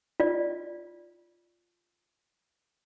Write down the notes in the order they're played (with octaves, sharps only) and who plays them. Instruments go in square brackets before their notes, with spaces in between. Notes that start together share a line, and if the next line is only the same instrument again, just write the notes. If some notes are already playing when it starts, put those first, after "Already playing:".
[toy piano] F4 D5